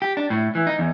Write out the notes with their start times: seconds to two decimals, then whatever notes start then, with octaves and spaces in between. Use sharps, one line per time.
0.02 G4
0.17 D4
0.30 A2
0.55 E3
0.67 D#4
0.79 E2